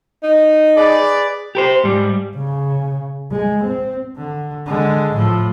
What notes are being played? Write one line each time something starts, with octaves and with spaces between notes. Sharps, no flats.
D#4
G#4 B4 D5
G4 A#4 C5
G#2 G3
C#3
G#3
C4
D3
D3 G#3
A2 F3